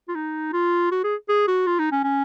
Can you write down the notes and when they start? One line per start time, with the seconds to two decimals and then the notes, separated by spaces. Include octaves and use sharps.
0.08 F4
0.15 D#4
0.53 F4
0.92 F#4
1.04 G#4
1.29 G#4
1.48 F#4
1.67 F4
1.79 D#4
1.92 C#4
2.04 C#4